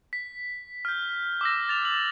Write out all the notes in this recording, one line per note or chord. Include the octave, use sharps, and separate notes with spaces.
B6
F6 G6
D6 E6 A#6
A6 F7
F#7